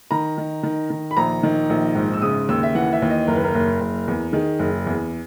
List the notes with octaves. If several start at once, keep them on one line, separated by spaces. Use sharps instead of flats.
D#3 A#5
D#3
D#3
D#3
B5
A#1 A#5
D#3
A#1
G#2
E6
C#3 D#6
D#2 E6
E5
E3 F#5
E5
D#2
D#5
F#1 A#4
B4
A#4
F#1
F#1
E2
D#3 G#4
F#1
E2